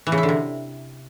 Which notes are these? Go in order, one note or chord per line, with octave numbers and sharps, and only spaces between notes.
E3
C#3
E4
D3
C3